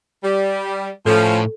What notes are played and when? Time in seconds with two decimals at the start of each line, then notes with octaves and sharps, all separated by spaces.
0.24 G3
1.06 A2 F3 C#4 A4